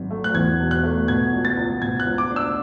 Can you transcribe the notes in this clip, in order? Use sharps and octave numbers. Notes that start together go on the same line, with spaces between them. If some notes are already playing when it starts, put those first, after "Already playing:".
Already playing: G#1 F#2
A3
F#6
E2 G#6
E1
F#6
A3
B2 G#6
C#2
A6
C#2
B2 G#6
F#6
C#2
D6
D4
E6